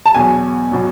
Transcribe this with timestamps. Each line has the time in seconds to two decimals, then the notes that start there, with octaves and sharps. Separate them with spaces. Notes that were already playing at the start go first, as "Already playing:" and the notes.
0.06 A5
0.15 E2 B2 F#3 G#5
0.71 B2 F#3